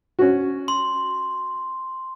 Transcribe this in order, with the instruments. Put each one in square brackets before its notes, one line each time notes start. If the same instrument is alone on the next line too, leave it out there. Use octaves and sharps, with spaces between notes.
[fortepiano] C#4 F#4
[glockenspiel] C6